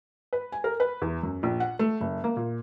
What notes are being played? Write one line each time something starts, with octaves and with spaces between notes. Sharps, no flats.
B4
G#5
A#4
B4
E2
F#2
A#1
F#5
A3
F#1
A#3
A#2